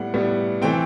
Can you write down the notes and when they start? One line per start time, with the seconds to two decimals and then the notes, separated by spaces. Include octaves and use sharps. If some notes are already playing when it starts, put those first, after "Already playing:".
Already playing: A2 G3 B3 F#5
0.14 A2 G3 B3
0.62 E3 A3 C4 G5